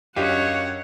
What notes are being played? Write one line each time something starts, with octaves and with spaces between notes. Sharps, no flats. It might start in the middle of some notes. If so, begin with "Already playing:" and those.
F#2 D4 G4 C#5 D#5 F5 F#5